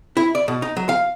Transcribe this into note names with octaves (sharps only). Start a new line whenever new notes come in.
E4
D5
B2
D#4
F#3
F5